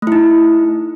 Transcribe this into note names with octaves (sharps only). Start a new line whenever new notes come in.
A3 D#4 E4